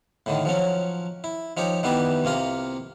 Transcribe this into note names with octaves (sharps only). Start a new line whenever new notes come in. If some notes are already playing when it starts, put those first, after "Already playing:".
A2 D3 D#3
F3 F#3 C#4
E4
F3 D#4 G4 C#5
D#3 E3 G3 B3 E4 G4
C2 C3 A#3 F4 A#5